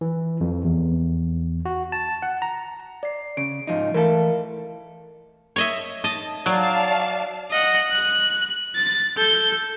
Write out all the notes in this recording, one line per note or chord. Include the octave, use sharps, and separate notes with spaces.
E3
F2
E2
F#4
A5
F#5
A#5
D5 C7
C#3 D7
G#2 F3 D#4
E3 A3 A4 A#4 F5
C#5 D#5 E5
D#5 A5
F#3 D5 F5 A5
D#5 F#5
F#6
A6
A4 G6